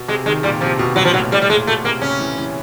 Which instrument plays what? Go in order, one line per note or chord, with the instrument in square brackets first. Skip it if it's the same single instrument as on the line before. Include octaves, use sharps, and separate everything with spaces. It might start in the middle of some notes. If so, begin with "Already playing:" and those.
Already playing: [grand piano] B2
[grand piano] C3 [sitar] G#3
[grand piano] D#3 [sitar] G#3
[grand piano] A#2 [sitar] G3
[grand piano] C3 [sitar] F3
[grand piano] B2
[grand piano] A#2 [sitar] F#3
[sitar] F3
[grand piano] A2 [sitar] F#3
[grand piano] A2 [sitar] G3
[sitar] G3
[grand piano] A#2 [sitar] G#3
[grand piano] B2 [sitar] A3
[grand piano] C3 [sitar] A#3
[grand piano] C#3 [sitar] C#4
[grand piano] E3
E3